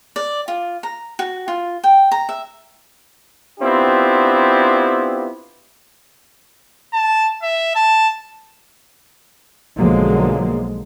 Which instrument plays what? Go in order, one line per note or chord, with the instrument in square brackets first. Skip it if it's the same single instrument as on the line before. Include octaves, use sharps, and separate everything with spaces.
[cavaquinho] D5
F4
A#5
F#4
F4
G5
A#5
E5
[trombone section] B3 C4 D4 E4 F4 G4
[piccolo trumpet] A5
E5
A5
[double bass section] B1 D3 F3 F#3 G#3 A#3